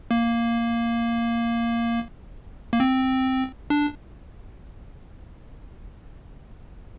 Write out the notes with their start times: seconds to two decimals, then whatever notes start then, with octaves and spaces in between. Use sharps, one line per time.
0.11 A#3
2.73 A#3
2.80 C4
3.70 D4